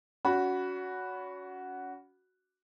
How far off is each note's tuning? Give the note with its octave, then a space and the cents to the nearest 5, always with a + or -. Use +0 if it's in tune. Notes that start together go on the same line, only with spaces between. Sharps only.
C#4 +35 F#4 +0 B5 +0